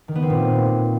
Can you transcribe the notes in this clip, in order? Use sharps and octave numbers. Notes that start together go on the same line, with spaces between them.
D#3
B3
C4
A#2